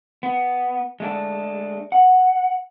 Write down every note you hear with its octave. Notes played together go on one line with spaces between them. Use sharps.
B3
G#3 A3 D4
F#5